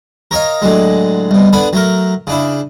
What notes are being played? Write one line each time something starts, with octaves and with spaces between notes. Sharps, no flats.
A#4 C#5 D#5 F5
A2 D3 F#3 G#3
C2 B2
D3 B3 D4 G#5 B5
F#3 A3 A#4
C#3 D4 E4